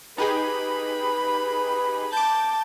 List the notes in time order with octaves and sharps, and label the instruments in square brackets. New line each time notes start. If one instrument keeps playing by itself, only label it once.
[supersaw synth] D#4 G4 G#4 [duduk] B4 [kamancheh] B5
[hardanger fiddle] A5 [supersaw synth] D6 G6